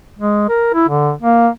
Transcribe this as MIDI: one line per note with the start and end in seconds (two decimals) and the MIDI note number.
0.19 0.48 56
0.49 0.70 70
0.74 0.87 64
0.88 1.12 50
1.22 1.48 58